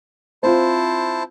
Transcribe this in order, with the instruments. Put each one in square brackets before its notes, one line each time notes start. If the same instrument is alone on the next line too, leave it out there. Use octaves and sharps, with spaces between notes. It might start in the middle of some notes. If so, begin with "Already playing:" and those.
[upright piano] C4 F4 [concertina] E4 C5 A5